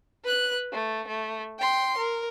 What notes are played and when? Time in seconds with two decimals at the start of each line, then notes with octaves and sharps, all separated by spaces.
0.24 B4 F#6
0.72 A3
1.08 A3
1.59 G5 C6
1.97 A#4